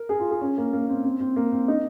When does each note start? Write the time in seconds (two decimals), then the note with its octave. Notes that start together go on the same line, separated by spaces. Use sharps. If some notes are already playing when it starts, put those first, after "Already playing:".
Already playing: A#4
0.09 G#4
0.20 F4
0.31 G#4
0.41 C#4
0.58 A#3
0.73 A#3
0.89 C4
1.05 C4
1.20 C4
1.36 A#3
1.52 C4
1.68 D#4